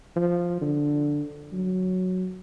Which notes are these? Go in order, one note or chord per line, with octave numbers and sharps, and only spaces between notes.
F3
D3
F#3